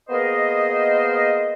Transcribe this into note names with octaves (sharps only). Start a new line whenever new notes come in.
A#3 B3 G#4 A#4 C5 D#5